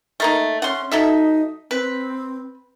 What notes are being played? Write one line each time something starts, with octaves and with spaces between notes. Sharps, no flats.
A3 A#3 D#4
C#4 F#5 C6
F#3 D#4 A4 E5
C4 B4